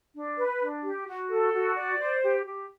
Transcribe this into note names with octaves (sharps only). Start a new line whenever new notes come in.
D4
B4
D4
G4
F#4
A4
F#4
D5
C5
G4
G4